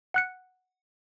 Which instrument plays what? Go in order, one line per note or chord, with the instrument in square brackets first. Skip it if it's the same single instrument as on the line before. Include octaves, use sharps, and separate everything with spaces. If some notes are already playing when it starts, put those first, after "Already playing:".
[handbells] F#5 F#6 C#7